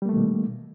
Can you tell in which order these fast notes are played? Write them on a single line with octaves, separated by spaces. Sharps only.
G3 A#3 A3 D#3 B2